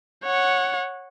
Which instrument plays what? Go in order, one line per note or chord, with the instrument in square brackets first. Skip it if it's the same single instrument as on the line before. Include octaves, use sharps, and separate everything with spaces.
[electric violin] C#5 F#5